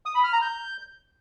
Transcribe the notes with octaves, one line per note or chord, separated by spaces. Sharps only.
D#6
B5
F6
A#5
G6